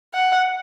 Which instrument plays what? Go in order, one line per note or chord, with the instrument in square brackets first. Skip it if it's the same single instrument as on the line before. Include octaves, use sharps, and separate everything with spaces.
[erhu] F#5